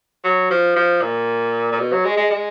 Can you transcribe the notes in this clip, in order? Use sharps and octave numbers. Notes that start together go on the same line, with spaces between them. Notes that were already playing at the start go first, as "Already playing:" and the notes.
F#3
F3
F3
A#2
A#2
B2
F#3
G#3
G#3
G#3